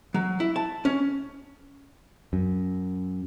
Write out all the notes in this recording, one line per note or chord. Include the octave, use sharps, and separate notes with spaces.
F#3
E4
A5
C#4
F#2